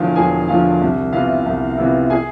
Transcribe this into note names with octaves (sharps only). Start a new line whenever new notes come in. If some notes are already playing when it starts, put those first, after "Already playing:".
Already playing: E1 E2 D3 F3 F4 F5
E1 G#4 G#5
E2 D3 F3 F4 F5
C2
C3 E3 B3 F4 F5
C2
C3 E3 B3 F4
G#4 G#5